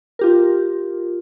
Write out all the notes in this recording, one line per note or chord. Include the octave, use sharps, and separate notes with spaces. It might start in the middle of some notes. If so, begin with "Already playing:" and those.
F4 G4 A#4